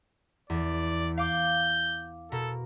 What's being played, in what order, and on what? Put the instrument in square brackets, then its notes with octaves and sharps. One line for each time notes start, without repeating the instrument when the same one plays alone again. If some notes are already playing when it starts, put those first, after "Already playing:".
[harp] E2 [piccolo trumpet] D5
[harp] F5 D6 [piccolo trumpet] G6
[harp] B2 A#4 [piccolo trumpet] A4